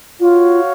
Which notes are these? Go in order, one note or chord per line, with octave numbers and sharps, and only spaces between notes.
F4 F#4 C#5 F5